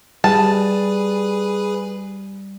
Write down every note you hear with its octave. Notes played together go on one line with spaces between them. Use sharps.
G3 G#4 B4 A5